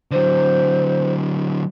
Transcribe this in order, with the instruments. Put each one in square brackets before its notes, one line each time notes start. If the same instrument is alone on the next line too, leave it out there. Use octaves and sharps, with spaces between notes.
[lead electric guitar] D3 F#3 [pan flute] C5